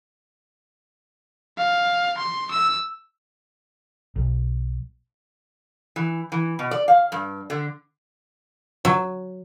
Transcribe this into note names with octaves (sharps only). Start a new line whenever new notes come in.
F5
C6
E6
B1
E3
E3
B2
D5
F5
G2
D3
F#3